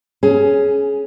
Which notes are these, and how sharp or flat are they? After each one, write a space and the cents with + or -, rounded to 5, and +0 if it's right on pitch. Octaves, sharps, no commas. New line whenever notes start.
C#4 +0 G#4 +20